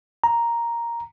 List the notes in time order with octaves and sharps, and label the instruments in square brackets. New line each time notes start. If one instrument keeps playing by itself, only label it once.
[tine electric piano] A#5